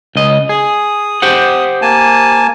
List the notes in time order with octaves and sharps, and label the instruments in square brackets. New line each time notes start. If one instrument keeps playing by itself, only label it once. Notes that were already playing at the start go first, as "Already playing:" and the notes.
[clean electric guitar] C#2 D#5
[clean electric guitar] G#4 [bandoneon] D#6
[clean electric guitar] G4 C5 F#5
[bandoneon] A#3 G#5 A5